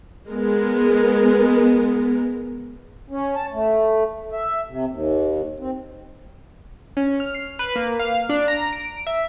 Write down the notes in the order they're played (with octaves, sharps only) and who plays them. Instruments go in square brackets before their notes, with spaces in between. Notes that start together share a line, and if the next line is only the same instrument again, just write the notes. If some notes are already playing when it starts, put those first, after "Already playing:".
[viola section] G#3 B3 A#4
[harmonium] C#4
A5
A3
E5
C3
D#2
C4
[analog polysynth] C#4
F6
C7
B4
A#3
F5
D4
A#5
D7
E5